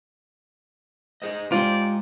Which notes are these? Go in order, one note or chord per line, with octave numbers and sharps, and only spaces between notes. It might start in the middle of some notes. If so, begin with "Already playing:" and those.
G#4 C5 D#5
G#3 F4 G4 C5 D5